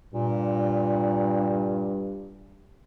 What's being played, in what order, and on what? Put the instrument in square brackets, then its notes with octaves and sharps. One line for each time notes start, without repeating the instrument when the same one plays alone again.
[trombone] G2 [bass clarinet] A#2